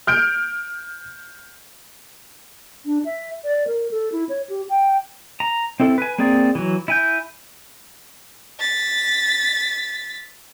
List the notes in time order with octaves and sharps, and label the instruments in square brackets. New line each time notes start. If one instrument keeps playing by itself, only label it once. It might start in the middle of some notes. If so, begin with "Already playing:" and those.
[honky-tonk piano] F6 G6 D7
[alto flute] D4
E5
D5
A#4
A4
E4
C#5
G4
G5
[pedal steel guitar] A#5
C4 E4 A4
B4 G#5
A#3 C4 G#4 D5
E3 F#3
E4 G#5 G6
[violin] A6 B6